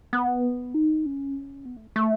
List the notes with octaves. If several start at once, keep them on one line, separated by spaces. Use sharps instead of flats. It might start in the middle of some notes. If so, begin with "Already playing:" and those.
B3
D#4
C#4
B3
A3
A3